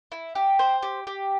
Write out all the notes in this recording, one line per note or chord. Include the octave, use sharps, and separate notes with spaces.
E4
G4
C5
G4
G4